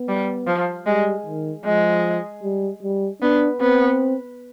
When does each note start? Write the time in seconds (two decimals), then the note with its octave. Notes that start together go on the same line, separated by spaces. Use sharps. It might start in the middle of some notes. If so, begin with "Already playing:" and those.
Already playing: B3
0.08 G3
0.47 F3
0.86 G3 G#3
1.26 D#3
1.64 F3 G#3
2.43 G3
2.83 G3
3.22 B3 D4
3.61 B3 C4